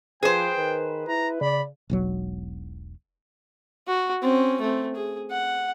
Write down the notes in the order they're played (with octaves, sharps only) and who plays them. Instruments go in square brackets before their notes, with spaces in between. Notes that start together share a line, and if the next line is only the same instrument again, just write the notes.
[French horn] F3 [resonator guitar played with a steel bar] G#4 C5 [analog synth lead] B4 [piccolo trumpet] G5
[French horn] D#3
[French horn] E4 [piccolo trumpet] A#5
[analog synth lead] C#3 [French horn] D5 [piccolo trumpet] B5
[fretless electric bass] E1 B1 F#3
[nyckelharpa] F#4
C4 C#4
A3 C4
G#4
F#5